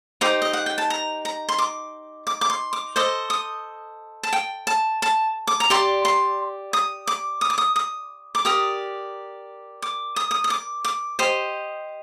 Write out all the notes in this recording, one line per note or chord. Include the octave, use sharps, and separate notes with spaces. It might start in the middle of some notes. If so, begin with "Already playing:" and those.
D#4 G4 C5 D6
D#5
F#5
G5
A5
A#5
A#5
C6
D6
D6
D6
C6
D6
A4 C5 D#5 D6
D#6
A5
G5
A5
A5
D6
A#5
G4 D5 C6
C6
D#6
D6
D#6
D6
D#6
D#6
D6
G4 A#4 D5 D#6
D6
D#6
D#6
D#6
D6
D6
G4 C5 D#5